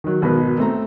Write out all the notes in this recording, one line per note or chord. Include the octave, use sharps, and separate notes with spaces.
D#3 F#3
G#1 B2 B3 A#4 B4
A3 C4 A#5